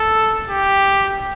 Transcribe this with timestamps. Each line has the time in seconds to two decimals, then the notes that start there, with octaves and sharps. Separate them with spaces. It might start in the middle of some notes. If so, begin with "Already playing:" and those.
Already playing: A4
0.49 G4